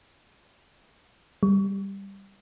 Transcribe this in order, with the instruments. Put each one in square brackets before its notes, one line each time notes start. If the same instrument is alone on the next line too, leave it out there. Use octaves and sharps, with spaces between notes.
[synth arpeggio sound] G3